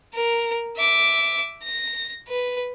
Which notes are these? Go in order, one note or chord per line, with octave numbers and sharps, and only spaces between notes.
A#4
E5 D6
A#6
B4